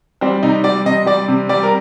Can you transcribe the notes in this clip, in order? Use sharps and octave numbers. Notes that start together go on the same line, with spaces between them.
G3 C4
C3 D#4
G3 D5
C3 D#5
G3 D5
C3
G3 D5
A#4